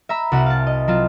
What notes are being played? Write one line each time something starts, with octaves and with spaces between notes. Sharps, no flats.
E5 A#5 B5 E6
C2 F#4 F#5
F5 A5
D#5
F#3 C4 F4